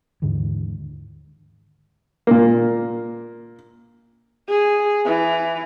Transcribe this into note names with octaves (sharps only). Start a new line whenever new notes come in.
D#2 G#2 D3 E3
A#2 A#3
G#4
E3